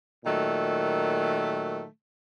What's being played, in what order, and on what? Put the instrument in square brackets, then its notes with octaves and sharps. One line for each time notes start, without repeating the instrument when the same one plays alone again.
[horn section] A#2 D#3 F#3 A3